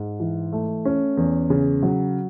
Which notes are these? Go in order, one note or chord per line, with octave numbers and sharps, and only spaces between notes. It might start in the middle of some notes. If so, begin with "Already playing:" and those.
Already playing: G#2
E3
A3
C#4
E2
C#3
F#3